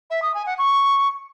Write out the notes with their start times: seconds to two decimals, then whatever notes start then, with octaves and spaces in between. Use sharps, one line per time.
0.10 E5
0.22 D#6
0.34 G#5
0.46 F#5
0.58 C#6